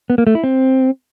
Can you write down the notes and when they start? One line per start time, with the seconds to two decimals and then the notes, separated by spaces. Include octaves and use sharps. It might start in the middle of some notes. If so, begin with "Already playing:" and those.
0.10 B3
0.18 A#3
0.27 A3
0.35 E4
0.44 C4